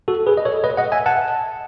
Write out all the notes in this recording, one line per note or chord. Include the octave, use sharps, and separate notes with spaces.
F#4 A4
G#4 B4
D#5
A4 C#5
B4 D#5
D#5 F#5
E5 G#5
F#5 A5